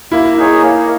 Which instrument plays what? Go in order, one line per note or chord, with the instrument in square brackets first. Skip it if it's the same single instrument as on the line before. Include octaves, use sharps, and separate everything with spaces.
[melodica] A#3 [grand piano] E4
[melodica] D#4 G#4 C#5
A#3